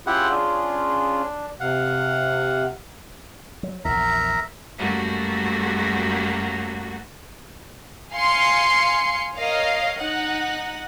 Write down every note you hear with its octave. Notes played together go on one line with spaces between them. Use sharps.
C#4 E4 F4 G4 G#4 F#5
D4
C3 F5 F#5
F#3
A#1 E2 A#4 E5 A#5
F#2 F#3 G3 A3 A#3 F#4
F5 G#5 C6 C7 C#7
A#4 C#5 D#5 F5
D#4 F#5